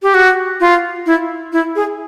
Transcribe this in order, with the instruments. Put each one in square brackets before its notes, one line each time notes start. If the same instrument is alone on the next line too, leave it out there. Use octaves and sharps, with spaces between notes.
[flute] G4
F#4
F4
E4
E4
G#4